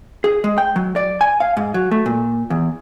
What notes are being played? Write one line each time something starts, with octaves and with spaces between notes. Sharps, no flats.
G#4
G#3
G5
F#3
D5
G#5
F5
G#2
F#3
A3
A#2
E2